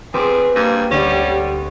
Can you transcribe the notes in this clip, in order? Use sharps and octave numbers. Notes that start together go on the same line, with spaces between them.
F2 C4 G4 G#4 B4
G2 A#3
D2 G3 C#4